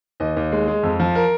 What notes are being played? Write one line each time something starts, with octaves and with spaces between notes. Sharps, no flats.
D#2 D#5
D#2
G#3
G#3
F2
F3
A#4